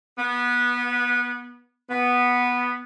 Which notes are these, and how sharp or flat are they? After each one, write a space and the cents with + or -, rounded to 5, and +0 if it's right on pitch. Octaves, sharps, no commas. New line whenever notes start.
B3 -20
B3 -5